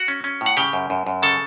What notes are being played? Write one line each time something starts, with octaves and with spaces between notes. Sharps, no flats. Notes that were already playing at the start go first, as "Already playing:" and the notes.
Already playing: F#4 F#5
C#4
C#4
A2
F#5
C#3 G4 G5
F#2
F#2
F#2
C#3 A4 A5